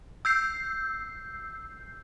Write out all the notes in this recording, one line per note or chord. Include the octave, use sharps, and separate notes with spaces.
E6 G6 C7